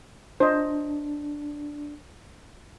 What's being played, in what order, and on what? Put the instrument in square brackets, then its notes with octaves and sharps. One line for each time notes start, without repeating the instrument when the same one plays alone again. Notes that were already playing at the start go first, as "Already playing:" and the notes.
[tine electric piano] D4 [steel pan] C5 D#5